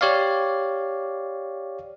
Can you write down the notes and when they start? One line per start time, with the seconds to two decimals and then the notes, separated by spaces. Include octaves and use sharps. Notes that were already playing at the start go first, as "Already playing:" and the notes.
0.01 G4 C#5 D5 F5